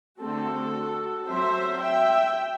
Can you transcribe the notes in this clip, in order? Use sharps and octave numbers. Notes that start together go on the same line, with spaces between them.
D3 A3 C4 F#4 A4
F#3 C4 C5 E5
E5 G5